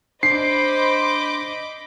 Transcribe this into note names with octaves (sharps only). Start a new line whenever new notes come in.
D4 C5 D#5 B5 D6 C7